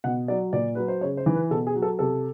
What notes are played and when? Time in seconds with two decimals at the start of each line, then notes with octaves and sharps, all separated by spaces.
0.04 B2 F#5
0.28 F#3 D5
0.53 A#2 D5
0.75 F#3 B4
0.88 C5
1.01 C#3 C#5
1.17 C5
1.26 E3
1.34 B4
1.51 B2 A4
1.67 G#4
1.75 F#3
1.82 A4
1.99 C3 A4